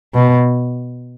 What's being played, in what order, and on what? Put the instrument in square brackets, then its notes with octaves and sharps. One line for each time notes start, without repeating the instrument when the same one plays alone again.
[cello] B2